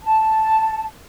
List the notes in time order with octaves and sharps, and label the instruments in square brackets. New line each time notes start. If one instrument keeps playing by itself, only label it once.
[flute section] A5